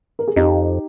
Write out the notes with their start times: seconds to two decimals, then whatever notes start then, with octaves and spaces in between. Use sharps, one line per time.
0.19 A#4
0.28 G#4
0.36 F2 D#4 G4